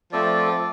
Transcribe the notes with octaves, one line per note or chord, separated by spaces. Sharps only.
F3 A3 C4 A4 D5